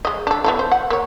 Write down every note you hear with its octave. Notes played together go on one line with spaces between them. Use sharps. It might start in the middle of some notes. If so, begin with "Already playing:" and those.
G#3 D#5
D4 A4
B3 E4 A4
C5
F#5
A#3 C#5